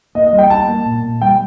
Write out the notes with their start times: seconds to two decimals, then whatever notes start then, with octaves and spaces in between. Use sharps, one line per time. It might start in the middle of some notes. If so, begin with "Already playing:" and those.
0.15 A#3 D#5
0.27 D#5
0.33 G3
0.38 G5
0.50 A#3 A5
0.68 A#3
0.86 A#2
1.03 A#2
1.21 G3 G5